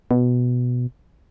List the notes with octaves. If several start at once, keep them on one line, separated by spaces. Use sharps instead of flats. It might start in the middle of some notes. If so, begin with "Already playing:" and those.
B2